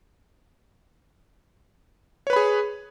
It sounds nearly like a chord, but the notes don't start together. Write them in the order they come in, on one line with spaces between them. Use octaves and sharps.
C#5 B4 B5 G#4